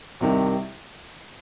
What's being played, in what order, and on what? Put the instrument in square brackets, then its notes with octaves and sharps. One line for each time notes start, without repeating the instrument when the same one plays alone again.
[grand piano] C2 C3 D#3